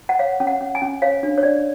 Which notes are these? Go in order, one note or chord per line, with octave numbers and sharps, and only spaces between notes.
F#5
C#5 F5
C#4
F#5
C#4
G#5
C#4
C#5 F5
D4
C#5
D4 D5